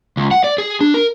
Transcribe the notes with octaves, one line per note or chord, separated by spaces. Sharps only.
C#2
F#5
D5
G#4
D4
A#4